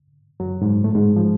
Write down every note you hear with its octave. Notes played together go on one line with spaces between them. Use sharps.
F#2 F#3
G#2 G#3
A2 A3
G#2 G#3
F3